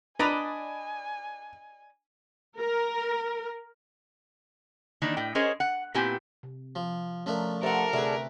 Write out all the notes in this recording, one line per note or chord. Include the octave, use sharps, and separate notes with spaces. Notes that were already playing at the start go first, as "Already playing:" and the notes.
D4 B4 D5 D#5 G#5 A#5 B5
A#4
D#3 E3 A#3 D4
A2 G5
C#4 G#4 A#4 C5 C#5 D#5
F#5
A#2 B3 C4 E4 G4 G#5
C3
F3
F3 A3 C#4 D4 A#4
G4 A4 A#4 C5 E5 F#5
D2 C3 D4 G#4 A4 B4 E5